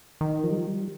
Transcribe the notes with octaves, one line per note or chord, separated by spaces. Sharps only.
D#3
F3
G3
F3
G3